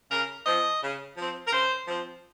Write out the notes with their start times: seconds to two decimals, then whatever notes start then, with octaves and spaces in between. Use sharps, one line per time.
0.10 C#3 A#4
0.46 F3 C4 D#5
0.82 C#3
1.17 F3 C4
1.46 A#4
1.52 C#3 C5
1.87 F3 C4